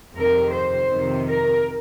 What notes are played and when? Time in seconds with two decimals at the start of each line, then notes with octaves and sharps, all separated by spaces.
0.15 F2 C3 D#3 A#4
0.52 C5
0.89 F2 C3 D#3
1.25 A#4